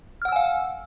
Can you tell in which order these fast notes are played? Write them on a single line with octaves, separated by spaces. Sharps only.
F6 F#5 E6 G#5 F5